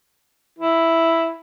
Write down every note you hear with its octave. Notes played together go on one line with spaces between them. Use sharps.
E4